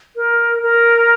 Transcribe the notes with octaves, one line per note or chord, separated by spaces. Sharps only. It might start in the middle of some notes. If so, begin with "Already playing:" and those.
A#4
A#4